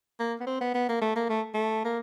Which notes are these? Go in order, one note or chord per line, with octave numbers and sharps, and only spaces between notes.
A#3
B3
C4
B3
B3
A#3
A3
A#3
A3
A3
A#3